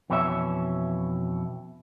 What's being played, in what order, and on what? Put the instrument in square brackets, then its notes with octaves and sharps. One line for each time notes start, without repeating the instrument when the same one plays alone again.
[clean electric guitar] F2 B2 E3 C#4 G4 E5